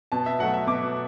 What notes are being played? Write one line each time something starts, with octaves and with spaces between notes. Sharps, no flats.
B2 A5
E5
F#3 A3 F#5
E5
B2 D6